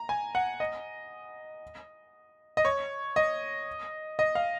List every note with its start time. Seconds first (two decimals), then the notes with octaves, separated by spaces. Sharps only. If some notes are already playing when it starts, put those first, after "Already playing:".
Already playing: A#5
0.09 G#5
0.35 F#5
0.60 D#5
2.57 D#5
2.65 C#5
3.16 D#5
4.19 D#5
4.35 F5